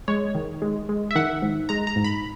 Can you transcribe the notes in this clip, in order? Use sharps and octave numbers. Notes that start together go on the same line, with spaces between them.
G#3 C#5
D#3
G#3
G#3
E5
D#3 F#5
G#2
G#3 A#5
A#5
G#2
B5